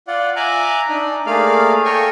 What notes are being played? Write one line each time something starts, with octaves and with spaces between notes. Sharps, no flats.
F4 D5 F#5
E5 G#5 A#5 D6 F#6
D4 D#4
A3 A#3 G#4 D5 F5 F6
A4 A#4 C#5 G5 G#5 C#6